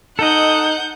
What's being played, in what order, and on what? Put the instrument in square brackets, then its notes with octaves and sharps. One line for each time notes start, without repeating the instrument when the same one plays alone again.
[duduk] D#4 [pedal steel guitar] A4 D#5 [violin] F#5 G6